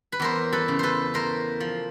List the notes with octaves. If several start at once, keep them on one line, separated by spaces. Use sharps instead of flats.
B4
E2 A#4 C5
A4 B4
C#3
A4 B4 C5
A3 A#4 C5
F3